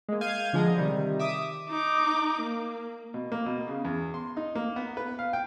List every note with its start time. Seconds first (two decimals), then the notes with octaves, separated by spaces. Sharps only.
0.09 G#3 A#3
0.21 F5 G6 G#6 D#7
0.53 D3 F3 G#3 A#5
0.77 C3 D#3 G3
1.19 E5 D6 D#6
1.69 D#4 D6
2.42 A#3
3.14 B2
3.32 A#3
3.46 B2
3.68 C#3
3.85 E2
4.14 C6
4.37 D#4
4.55 A#3
4.76 B3
4.97 B4
5.19 F5
5.33 G5